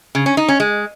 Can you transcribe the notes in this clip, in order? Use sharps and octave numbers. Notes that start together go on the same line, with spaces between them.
C#3
C#4
D#4
C#4
G#3